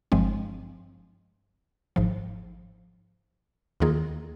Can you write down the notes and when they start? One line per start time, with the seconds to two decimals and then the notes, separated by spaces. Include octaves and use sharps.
0.12 G1 G2 F3 G#3 C4
1.96 G#1 G#2 F3
3.80 D#2 D#3 A#3 F4 G#4